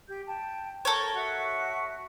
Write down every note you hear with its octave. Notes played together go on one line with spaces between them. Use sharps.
G4 G6
G5 A5
A4 A#4 C#5
F#4 E5 F#5